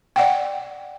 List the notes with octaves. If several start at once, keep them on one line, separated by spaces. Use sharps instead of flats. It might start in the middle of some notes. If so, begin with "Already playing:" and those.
D5 F#5 G5